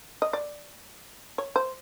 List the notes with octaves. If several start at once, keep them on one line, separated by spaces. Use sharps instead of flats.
D#5
D5
C#5
C5